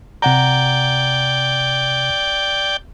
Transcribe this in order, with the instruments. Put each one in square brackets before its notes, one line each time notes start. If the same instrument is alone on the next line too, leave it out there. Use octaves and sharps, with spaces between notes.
[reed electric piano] C3 F#5 A#5 [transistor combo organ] D5 G5